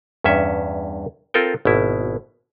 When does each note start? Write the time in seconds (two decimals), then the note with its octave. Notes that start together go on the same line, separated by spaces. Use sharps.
0.24 E2 G2 C#4 E5
1.34 C4 F4 A4 A#4 G5
1.65 G#1 B2 E4